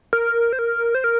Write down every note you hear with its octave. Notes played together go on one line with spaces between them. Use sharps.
A#4
C5
A#4
C5
A#4